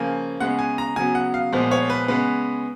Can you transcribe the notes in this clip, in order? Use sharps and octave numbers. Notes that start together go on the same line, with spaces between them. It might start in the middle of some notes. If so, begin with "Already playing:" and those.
Already playing: C#3 F3 A#3 G#5
C#3 G#3 B3 F#5
G#5
A#5
C#3 F#3 B3 G#5
F#5
F5
A#2 F3 G#3 B3
C#5
B4
C#3 G#3 B3 B4